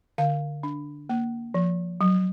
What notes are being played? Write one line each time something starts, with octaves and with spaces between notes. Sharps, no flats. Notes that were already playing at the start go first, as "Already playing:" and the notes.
D3 F5
D4
A#3
F3
F#3